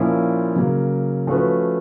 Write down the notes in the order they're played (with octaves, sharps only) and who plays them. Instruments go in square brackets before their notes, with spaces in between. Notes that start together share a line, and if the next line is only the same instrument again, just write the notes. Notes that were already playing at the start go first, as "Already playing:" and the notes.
Already playing: [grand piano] A#2 F3 A#3 C#4 E4
C#3 F#3 A#3
F3 A3 C#4 F#4 B4